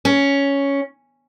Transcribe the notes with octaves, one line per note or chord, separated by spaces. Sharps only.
C#4